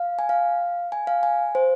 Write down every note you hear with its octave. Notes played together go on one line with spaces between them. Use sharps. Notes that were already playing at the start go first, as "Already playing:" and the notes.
Already playing: F5
G#5
F5
G#5
F5
G#5
C5